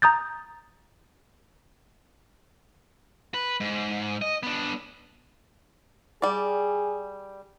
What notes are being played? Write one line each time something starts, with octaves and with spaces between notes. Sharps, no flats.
A#5 D#6 G6 A6
B4
G#2
D#5
B3 D4
G3 G#4 D5